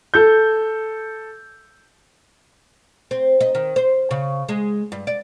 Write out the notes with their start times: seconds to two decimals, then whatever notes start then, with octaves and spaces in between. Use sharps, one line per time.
0.14 A4 G6
3.11 C4
3.41 D#4
3.55 D#3
3.76 C5
4.11 C#3
4.49 G#3
4.92 G2
5.07 D5